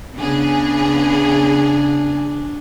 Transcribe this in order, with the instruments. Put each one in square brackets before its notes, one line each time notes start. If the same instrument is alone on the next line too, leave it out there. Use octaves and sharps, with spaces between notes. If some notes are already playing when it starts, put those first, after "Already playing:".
[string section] C#3 B3 G#4 [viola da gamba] D4